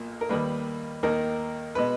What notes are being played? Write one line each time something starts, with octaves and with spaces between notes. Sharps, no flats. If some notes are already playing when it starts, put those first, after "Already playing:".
Already playing: B1 A#2 A#3
A#4
D#2 D#3 G3 A#3 B4
D#2 D#3 A#3 A#4
B2 G#3 B4